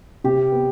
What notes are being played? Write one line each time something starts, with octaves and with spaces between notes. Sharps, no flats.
C3 G4
B3